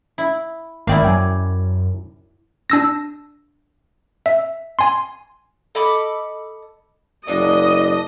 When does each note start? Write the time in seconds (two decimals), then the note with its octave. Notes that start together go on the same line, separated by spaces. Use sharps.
0.18 E4
0.87 G#1 A#3 E4 D5 F5 G5
1.04 F#2 G5 G#5
2.70 D4 E6 A#6
4.26 E5
4.79 G#5 C6
5.75 A4 D#5 B5 D6
7.28 F#1 E3 D4 D#5